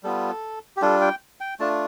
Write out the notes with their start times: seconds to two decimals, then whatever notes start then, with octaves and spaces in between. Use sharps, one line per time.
0.03 G3 B3 F4 A4
0.77 G4
0.82 G3 D4 F4 A4
1.01 G5
1.41 G5
1.60 A3 D4 F4 A5